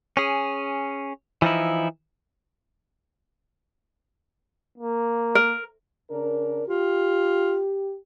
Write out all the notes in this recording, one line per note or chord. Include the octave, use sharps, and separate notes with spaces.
C#4 G#4
E3 F3 D#4 E4
A#3
A#4
C#3 D4 A#4
F4 G4